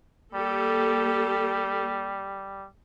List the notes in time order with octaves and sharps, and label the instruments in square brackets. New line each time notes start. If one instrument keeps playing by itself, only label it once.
[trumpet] G3 [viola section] A#3 G4 A4